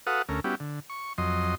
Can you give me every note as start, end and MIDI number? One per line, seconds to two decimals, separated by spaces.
0.07 0.22 66
0.07 0.22 69
0.07 0.22 71
0.07 0.22 77
0.07 0.22 78
0.07 0.22 87
0.29 0.40 38
0.29 0.40 57
0.29 0.40 61
0.29 0.40 70
0.44 0.55 55
0.44 0.55 59
0.44 0.55 61
0.44 0.55 64
0.44 0.55 66
0.44 0.55 67
0.60 0.80 50
0.90 1.13 85
1.18 1.55 41
1.18 1.55 54
1.18 1.55 75
1.18 1.55 84